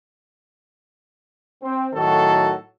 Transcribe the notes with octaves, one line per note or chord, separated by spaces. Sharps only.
C4
A2 D#3 F#3 F#4 A4